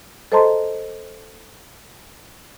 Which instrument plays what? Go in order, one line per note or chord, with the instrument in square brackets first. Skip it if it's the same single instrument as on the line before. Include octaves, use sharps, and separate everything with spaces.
[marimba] A4 C5 D#5 A5 A#5 C6